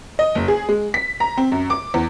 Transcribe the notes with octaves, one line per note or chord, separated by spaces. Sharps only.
D#5
F#1
G#4
G#3
B6
A#5
C4
F#2
D6
E2